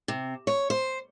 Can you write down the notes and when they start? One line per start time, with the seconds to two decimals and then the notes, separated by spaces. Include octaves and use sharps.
0.08 C3
0.47 C#5
0.70 C5